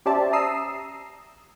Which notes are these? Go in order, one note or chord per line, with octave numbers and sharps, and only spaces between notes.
C#4 G4 C5 D5 E5 A5
A#5 D#6 E6 C7